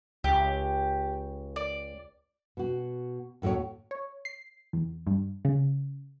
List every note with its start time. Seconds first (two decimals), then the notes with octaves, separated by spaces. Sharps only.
0.24 C#2 G4
1.56 D5
2.57 B2 F#4
3.42 D#2 A2 A3 F#4 C#5
3.91 C#5
4.25 C7
4.73 E2
5.07 G2
5.45 C#3